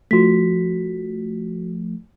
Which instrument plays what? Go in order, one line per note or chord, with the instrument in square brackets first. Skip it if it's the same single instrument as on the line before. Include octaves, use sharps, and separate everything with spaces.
[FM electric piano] F3 A3 [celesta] F#4 B6